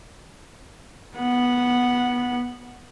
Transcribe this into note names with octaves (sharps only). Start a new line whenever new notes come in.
B3 F#5